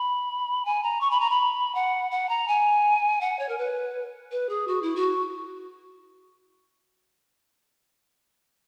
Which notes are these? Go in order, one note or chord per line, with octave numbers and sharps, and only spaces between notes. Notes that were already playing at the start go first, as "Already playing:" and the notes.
Already playing: B5
G#5
A#5
C#6
B5
A#5
B5
F#5
F#5
A#5
G#5
F#5
C#5
A#4
B4
B4
G#4
F#4
E4
F#4